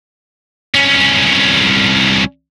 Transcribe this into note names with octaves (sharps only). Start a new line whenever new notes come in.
C2 C#4